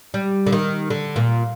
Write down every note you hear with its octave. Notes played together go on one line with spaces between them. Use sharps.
G3
D3
D#3
D3
A#2